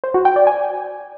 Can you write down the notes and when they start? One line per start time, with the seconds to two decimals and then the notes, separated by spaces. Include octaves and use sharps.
0.04 C5
0.14 F#4
0.25 G5
0.36 D5
0.47 G#5